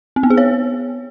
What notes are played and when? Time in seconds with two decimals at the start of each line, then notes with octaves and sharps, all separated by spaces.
0.16 C4
0.23 B3
0.30 G#4
0.37 C#5